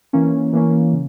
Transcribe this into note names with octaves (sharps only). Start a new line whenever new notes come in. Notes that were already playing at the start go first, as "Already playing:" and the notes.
E3 A#3 C#4
E3 A#3 C#4
C#3